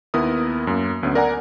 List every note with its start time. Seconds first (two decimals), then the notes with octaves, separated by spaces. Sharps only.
0.14 D#2 B3 E4 A#4 D#6
0.67 F#2 A#3
1.03 D2 B3 C#4
1.15 A#4 D5 F#5 G#5 A#5